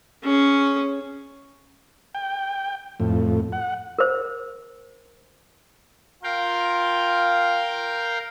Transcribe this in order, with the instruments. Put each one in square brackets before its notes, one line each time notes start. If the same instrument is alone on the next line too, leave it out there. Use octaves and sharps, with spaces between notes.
[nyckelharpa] C#4 G#4
[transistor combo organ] G5
F2 A2
F#5
[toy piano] A#4 C5
[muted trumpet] F4 [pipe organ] A#4 F5 G5